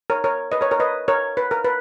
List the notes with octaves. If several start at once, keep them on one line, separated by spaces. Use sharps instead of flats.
A#4 C#5
A#4 C#5
B4 D#5
A#4 C#5
A#4 C#5
B4 D#5
A#4 C#5
B4
A#4
B4